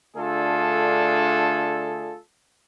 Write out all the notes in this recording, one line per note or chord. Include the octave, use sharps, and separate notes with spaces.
D3 A3 D4 F4 G#4 A4